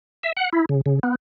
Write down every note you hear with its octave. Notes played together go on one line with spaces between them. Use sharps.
E5
F#5
E4
C#3
C#3
B3